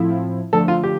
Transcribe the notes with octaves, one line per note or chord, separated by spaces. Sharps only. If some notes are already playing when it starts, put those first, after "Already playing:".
Already playing: A2 F3 C4 E4
D3 F3 A3 D4 A4
F4
G4